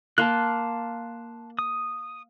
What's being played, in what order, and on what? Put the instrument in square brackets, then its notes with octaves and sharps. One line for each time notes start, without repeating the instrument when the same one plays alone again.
[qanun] A#3 [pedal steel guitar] A5 C6 F#6
[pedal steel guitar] D#6